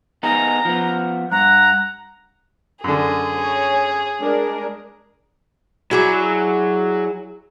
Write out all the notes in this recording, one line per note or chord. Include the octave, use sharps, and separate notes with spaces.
B3 D#4 G#4 A#5
F3 B3
G2 F#5 A#5
F#2 D3 G#4
C#5 G#5
G#3 D4 A#4
F#3 E4 G#4 D5